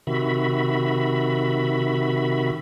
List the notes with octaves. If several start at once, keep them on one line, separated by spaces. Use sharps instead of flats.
C3 D#3 F#4 E5 B5